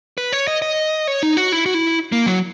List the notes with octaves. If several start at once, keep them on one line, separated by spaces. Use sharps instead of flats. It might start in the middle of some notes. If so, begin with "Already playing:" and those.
B4
C#5
D#5
D#5
C#5
D#4
F#4
E4
F#4
E4
A#3
F#3